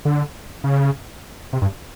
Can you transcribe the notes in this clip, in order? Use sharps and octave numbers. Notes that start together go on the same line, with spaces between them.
D3
C#3
C3
G2